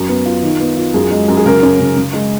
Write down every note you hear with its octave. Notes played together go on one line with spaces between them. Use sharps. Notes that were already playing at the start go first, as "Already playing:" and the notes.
Already playing: F#2
B3
F4
D#3
B3
F4
F#2 G#4
G#3
F#2
G#4
C#3 A#4
C#4
C#3
C#3
G#3